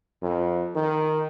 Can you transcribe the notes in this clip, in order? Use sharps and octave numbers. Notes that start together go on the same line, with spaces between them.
F2
D#3